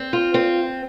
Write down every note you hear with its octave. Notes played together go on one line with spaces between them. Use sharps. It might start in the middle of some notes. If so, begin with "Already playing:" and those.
Already playing: C4
F4
C4